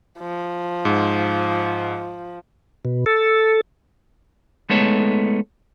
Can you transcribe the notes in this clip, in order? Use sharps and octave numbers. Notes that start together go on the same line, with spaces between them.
F3
G#2
B2
A4
G#3 A3 B3 D#4 A4 C#5